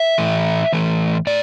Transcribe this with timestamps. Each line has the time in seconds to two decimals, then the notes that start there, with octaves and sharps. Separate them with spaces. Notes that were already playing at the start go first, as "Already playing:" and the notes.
Already playing: E5
0.18 A2 E3 A3
0.73 A2 E3 A3
1.27 A2 D5